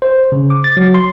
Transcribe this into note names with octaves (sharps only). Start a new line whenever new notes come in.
C5
C#3
D6
A6
F#3
C6